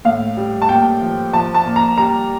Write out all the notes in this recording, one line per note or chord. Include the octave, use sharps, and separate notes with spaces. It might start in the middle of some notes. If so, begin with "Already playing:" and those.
A2 F5
G3
A5
A#2 G5
F3
F3 A5
A5
A#2
A#5
G3 A#5